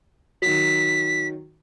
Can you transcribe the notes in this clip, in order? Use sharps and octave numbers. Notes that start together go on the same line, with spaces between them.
D#3 F#3 B6